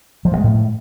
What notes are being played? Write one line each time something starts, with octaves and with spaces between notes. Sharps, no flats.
F3
G2
G#3
A2